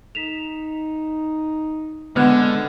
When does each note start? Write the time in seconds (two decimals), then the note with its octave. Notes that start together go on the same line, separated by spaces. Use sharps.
0.15 D#4 B6 E7 F7
2.16 D3 G#3 B3 F6 F#6 G#6